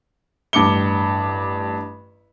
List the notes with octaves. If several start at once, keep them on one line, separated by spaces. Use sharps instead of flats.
A1 G2 D6 C#7 G7